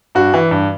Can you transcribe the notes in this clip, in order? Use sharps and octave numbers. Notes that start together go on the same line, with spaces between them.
G2 F#4
E3
G2